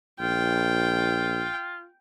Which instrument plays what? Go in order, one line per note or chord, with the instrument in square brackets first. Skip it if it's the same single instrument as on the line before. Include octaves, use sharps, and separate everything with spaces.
[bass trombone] A#1 [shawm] F4 [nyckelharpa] G5